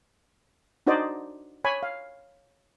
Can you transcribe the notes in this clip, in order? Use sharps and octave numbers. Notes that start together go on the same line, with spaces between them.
D4 D#4 F#4 C5 D5 D#5
C#5 G#5 B5
F5